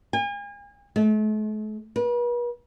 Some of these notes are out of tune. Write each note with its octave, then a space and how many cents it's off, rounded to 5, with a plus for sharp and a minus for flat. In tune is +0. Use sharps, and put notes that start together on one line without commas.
G#5 -40
A3 -45
B4 -40